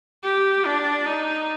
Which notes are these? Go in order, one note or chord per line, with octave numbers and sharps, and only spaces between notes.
G4
D4
D#4